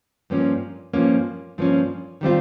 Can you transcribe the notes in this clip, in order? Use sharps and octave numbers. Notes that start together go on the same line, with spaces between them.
G2 F3 A#3 C#4
G2 F3 A#3 C#4
G2 F3 A#3 C#4
D#3 G3 C4 F4